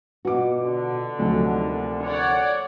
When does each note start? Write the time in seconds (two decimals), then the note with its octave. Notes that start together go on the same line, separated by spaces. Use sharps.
0.25 B2 F4 F#4 B4 D6
0.60 D3
1.18 D2 C3 F3 F#3 A3 D#4
1.63 A#3
2.06 C#5 D5 F#5